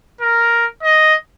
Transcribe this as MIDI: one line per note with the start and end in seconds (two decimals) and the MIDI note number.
0.21 0.65 70
0.83 1.15 75